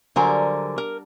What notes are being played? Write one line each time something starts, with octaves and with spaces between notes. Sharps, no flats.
D3 F#3 G3 A#4 C5 G#5
A#4